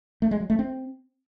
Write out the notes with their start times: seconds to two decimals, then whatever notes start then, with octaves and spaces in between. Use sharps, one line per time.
0.22 A3
0.31 G#3
0.40 F#3
0.50 A3
0.59 C4